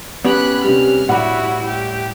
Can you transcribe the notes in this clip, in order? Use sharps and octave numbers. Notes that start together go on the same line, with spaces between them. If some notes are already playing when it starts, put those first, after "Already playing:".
B3 C#4 G4 B5 F#6
C3 G3 F6
A2 G3 E4 F#4 F#5
G4